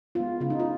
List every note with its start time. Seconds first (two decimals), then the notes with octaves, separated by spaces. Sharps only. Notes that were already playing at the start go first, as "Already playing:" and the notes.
0.15 G#3 B3 F4
0.40 C#3 F4
0.50 D#4
0.60 F4